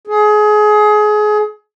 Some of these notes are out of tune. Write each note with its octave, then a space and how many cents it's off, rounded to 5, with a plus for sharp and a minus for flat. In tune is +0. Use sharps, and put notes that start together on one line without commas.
G#4 +25